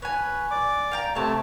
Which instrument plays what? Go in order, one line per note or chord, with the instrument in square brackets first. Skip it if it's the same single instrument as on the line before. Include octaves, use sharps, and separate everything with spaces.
[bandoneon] B4 [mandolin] C#5 G#5
[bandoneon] D5 D6
[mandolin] F5 G5 A#5
[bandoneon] C3 A3 [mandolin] C#5 A5